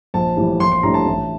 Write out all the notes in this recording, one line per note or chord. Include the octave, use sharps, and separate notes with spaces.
A#1 A5
A2 E3 G3
A#1 C6
C6
A2 G3 D4 A#5
A5
A1